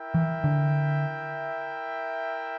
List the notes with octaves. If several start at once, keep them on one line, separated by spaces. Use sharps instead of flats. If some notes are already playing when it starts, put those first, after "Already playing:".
Already playing: E4 A#4 E5 G5
E3
D3